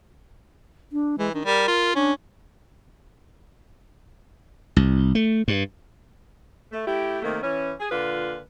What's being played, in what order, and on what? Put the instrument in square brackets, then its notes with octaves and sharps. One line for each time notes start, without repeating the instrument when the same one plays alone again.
[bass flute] D4
[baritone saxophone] E3 [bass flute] G#3
[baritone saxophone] D#3 [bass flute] D4
[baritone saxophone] G3 [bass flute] A#4
[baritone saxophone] F4
[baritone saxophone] C#4 [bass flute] D4
[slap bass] C2
A3
G2
[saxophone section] A3
A3 E4 G4
C3 D#3 A3 A#3
E3 C#4
G#4
A#2 D3 F4 B4